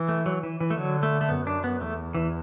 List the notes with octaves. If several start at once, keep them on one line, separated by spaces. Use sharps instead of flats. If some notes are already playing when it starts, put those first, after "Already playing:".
Already playing: E3
A3
F#3
E3
E3
A3
D3 F#3
A3
A3
F#2 B3
D4
B3
E2 A3
E3